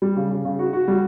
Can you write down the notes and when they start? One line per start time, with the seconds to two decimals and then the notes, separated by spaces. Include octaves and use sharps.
0.02 G3
0.16 C#3
0.31 C#3
0.45 C#3
0.59 F#4
0.73 F#4
0.88 G3